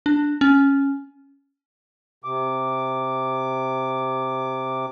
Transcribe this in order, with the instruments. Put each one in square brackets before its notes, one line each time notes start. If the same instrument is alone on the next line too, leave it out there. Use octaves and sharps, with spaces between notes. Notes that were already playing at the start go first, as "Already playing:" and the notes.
[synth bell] D4
C#4
[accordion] C3 D6